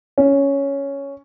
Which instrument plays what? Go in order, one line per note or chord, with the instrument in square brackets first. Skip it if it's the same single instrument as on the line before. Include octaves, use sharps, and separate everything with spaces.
[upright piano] C#4